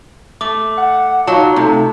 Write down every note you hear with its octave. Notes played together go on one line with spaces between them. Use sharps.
A3 D6
F#5
F#3 D#4 F4 A5
C3 A3